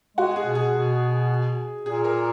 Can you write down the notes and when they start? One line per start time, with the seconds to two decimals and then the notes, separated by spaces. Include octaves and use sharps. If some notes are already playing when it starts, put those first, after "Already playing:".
0.17 G#3 F#4
0.36 G#4
0.45 B2
0.55 G#4
0.73 B2
1.85 A#2 G#4
2.05 A#4